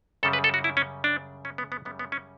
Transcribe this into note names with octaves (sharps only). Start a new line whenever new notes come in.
F#2 C#3 G3 A4
B4
A4
F#4
E4
C#4
D4
C#4
B3
B3
F#2 C#3 G3 B3
B3
C#4